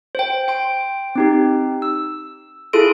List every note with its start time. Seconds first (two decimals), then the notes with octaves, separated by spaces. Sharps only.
0.15 C5 G5
0.48 G5 C6 D7
1.16 C4 D#4 G4
1.82 E6
2.73 E4 F4 G#4 A4 C6 D7